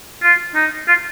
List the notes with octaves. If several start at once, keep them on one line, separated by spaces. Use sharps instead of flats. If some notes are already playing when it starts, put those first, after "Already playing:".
F4
D#4
F4